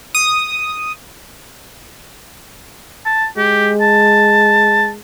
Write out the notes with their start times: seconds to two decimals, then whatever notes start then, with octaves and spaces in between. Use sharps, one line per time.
0.15 D#6
3.05 A5
3.37 G#3 G4
3.81 A5